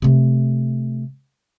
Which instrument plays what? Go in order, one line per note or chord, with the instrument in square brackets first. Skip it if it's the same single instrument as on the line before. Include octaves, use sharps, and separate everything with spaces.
[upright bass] C3 A3